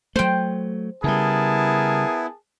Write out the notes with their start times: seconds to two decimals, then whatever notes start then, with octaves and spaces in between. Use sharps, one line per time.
0.16 F#3 A3 C5 G5
1.04 C#3 G3 B3 E4 G#4 A#4 A5